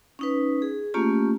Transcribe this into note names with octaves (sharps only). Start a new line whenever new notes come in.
C#4 D#4 B4
G#4
A3 A#3 C#4 F4 G4